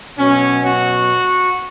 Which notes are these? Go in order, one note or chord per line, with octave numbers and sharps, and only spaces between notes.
B2 F#3 C#4
F#4